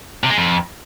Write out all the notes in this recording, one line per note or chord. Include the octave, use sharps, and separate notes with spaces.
C3
G#3
F2